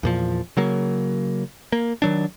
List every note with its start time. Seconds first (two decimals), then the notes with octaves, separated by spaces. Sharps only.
0.03 E2 A#2 F3
0.57 C#3 F#3 A#3
1.72 A#3
2.02 D#3 F#3 D4